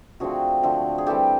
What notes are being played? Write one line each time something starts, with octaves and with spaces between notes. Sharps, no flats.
D3 F3 A3 C4 F#4 G#4
D3 F3 A3 C4
G#4
E3 G3 C4 G4 A4